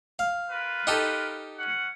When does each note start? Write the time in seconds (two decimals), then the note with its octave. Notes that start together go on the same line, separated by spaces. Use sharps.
0.19 F5
0.50 F4 A#4 B4
0.87 D#4 G4 A4
1.58 C#4 F#5